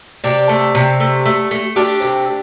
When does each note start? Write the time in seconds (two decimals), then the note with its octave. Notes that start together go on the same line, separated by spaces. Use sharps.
0.24 C3 D4 G4
0.49 A3
0.75 C3
1.00 A3
1.26 A3
1.51 A3
1.76 A3 D4 G4
2.02 C3